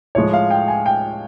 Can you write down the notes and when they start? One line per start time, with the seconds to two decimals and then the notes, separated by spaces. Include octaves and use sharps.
0.15 A2 F3 G#3 C#5
0.33 F5
0.50 G5
0.68 G#5
0.86 G5